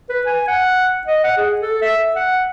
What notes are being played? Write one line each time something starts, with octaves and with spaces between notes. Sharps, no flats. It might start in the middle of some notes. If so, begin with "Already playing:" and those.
B4
G#5
F#5
D#5
F#5
G#4
A4
E5
F#5